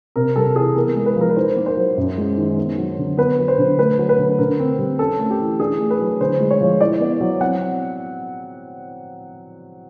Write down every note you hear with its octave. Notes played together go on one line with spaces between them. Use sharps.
C3 A#4
G3 A4
E3 G#4
B3 A#4
G#3
B4
F3
A#4
B4
D#4 C5
A#3
C5
F#3
F#2
G#3
D#3
B3
F#3
D3
B3 B4
F#3
C5
D3
A3 B4
F#3
B4
D3
D3 A#4
C4
G3
C#4 A4
A3
G4
E3
D4 G#4
A3
B4
F#3
D3 C5
G#3
C#5
F3
E4 D5
B3
F#3
C4 F#5